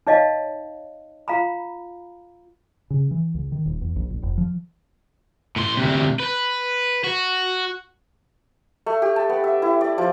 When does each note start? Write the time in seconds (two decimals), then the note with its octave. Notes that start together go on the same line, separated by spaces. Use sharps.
0.07 D#4 C#5 D#5 F5 A5
1.28 F4 F5 A#5 B5
2.90 C#3
3.11 E3
3.34 C#2
3.52 D#3
3.66 D#1
3.81 E2
3.96 A#1
4.10 A#1
4.22 F1
4.38 F3
5.56 A2 C6
5.77 D2 C3
6.20 B4
7.04 F#4
8.86 A3
9.02 G4
9.16 A5
9.29 B3
9.44 E5
9.62 E4
9.81 D5
9.98 F3